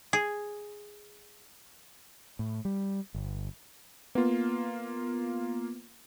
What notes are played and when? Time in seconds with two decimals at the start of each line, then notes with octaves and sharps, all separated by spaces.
0.13 G#4
2.39 A2
2.65 G3
3.15 G1
4.15 A#3 B3 F4